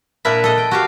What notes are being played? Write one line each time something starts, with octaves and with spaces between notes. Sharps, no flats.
A#2 D4 E4 A#4 B4 E5
A4 D#5
G5
F#4 G4 F5